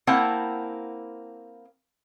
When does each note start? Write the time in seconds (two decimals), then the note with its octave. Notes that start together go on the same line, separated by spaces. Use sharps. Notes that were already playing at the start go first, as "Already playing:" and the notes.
0.07 A#3 C4 E4 C5 F#5 A5